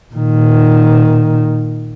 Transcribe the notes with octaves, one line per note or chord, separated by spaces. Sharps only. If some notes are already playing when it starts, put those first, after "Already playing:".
A#2 D#3